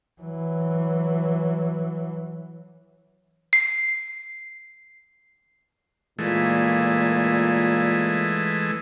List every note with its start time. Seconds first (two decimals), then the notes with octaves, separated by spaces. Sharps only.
0.22 E3 F#3
3.53 C7
6.19 A#2 E3 G#3 A3